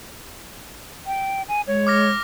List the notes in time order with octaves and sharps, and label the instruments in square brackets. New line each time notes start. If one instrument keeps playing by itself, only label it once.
[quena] G5
G#5
[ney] G#3 [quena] C#5
[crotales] D6 F6 A#6